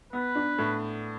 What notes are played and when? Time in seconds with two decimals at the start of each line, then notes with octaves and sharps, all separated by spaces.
0.13 B3 B4
0.35 D4
0.58 A2